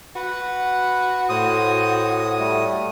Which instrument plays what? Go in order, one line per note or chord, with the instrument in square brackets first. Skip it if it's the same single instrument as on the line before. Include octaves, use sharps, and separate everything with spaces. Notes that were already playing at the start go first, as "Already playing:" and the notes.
[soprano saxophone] F#4 [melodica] B4 F#5
[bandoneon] A2 D#6 [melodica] C5
[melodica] G3 A3